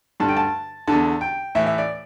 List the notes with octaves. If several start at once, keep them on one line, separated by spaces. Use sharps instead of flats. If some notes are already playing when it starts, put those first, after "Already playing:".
G2 D3 A5
G5
A5
E2 D3 A5
G5
A2 E3 E5
E5
D5